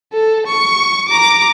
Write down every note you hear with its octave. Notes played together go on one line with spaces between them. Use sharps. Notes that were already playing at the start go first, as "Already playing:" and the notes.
A4
C#6
A#5 D6